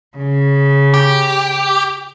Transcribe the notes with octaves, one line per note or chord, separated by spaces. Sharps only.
C#3
G4